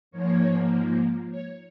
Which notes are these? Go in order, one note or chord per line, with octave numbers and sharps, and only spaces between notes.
G#2 F3 A#3 C#5
C#5